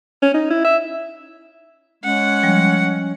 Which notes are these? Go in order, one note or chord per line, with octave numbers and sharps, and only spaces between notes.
C#4
D#4
E4
E5
G#3 C#4 F#5
F3 G3